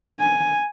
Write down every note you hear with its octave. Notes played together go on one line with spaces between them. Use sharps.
G#5